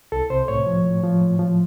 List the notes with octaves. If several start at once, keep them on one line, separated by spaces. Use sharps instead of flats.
C2 A4
C3 C5
A2 C#5
F3
A2
F3
A2
F3